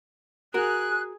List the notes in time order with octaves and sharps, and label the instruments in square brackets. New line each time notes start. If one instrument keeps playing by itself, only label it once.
[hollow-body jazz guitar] F#4 A#4 [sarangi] G#4 [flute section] F#6